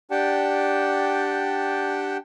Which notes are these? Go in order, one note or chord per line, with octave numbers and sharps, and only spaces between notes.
D4 G4 D5 F#5 G5 A5